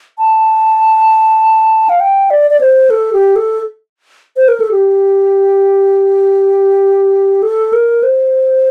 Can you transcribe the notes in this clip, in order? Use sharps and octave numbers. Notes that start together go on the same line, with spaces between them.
A5
F5
G5
D5
D5
C5
A4
G4
A4
C5
A#4
A4
G4
A4
A#4
C5